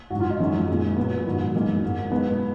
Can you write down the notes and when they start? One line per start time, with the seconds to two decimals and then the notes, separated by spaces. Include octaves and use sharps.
0.10 G#2 F#3 F#4
0.20 F4
0.30 D#4
0.39 F#2 D#3 G#3 C#4
0.68 A#2 G#3
0.96 A#2 F#3 B3
1.26 G#2 D#3 F#3
1.54 F#2 D#3 G#3 A#3
1.82 G#2 F#3
2.10 B2 G#3 B3